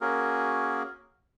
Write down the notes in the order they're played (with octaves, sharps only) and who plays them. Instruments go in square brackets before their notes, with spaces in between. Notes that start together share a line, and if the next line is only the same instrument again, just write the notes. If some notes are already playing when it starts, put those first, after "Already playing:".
[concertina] A#3 C#4 F#4 G#4 A#4